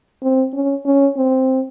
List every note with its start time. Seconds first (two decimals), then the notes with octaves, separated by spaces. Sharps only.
0.23 C4
0.53 C#4
0.85 C#4
1.17 C4